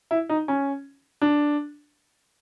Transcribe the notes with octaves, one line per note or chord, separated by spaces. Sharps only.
E4
D#4
C#4
D4